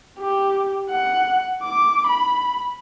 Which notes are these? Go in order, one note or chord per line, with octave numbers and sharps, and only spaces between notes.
G4
F#5
D6
B5